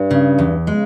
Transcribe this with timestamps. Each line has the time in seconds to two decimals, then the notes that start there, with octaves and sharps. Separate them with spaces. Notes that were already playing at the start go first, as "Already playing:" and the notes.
Already playing: G2
0.11 C#3
0.39 E2
0.67 C#3 G#3